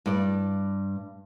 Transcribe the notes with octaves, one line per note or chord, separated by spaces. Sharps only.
G2 D5